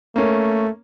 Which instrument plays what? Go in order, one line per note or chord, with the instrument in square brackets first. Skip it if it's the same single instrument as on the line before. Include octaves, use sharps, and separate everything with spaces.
[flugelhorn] A3 [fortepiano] A#3 C#4